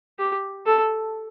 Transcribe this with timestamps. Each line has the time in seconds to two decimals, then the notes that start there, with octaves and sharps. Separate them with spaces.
0.19 G4
0.66 A4